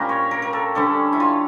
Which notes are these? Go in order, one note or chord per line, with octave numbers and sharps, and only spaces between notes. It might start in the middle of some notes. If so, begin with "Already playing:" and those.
Already playing: A#2 G3 A#3 C#4 A#4
C#5
A#4
A#4
A4
D3 G3 C#4 A4
E4
F4